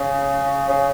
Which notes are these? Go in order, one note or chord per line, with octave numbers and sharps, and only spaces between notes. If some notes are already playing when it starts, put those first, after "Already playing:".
Already playing: C#3
C#3